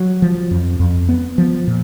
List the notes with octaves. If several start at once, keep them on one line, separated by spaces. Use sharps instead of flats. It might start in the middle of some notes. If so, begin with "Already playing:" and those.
Already playing: F#3
F3
F2
F2
B3
F3
A#2